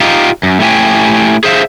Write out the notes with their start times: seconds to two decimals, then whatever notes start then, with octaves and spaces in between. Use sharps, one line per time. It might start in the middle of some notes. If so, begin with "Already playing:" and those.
0.01 D#4 F4 G4
0.43 F#2
0.60 A3 E4 G4 C#5 G5 G#5
1.44 G#4 C5 E5 F5